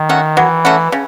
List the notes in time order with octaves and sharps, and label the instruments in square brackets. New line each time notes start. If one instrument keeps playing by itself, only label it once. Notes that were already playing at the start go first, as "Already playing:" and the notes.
Already playing: [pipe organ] D#3
[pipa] A3 C#4 F#4
[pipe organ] E3 [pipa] F#3
[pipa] A3 C#4 F#4
C#3